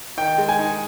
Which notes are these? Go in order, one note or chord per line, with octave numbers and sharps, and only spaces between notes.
D#3 G5
G#3
G#5
D#4